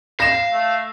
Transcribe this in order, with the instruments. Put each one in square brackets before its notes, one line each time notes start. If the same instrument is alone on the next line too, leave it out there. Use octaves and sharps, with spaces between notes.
[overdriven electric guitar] F5 [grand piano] A#6 E7
[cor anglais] A3